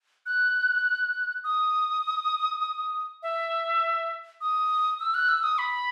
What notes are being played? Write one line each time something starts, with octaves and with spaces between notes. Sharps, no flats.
F#6
D#6
E5
D#6
E6
F#6
E6
D#6
B5